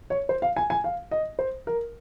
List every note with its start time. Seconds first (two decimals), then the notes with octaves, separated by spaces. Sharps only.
0.10 C#5
0.29 C5
0.42 F5
0.57 G#5
0.70 G#5
0.84 F5
1.11 D#5
1.39 C5
1.67 A#4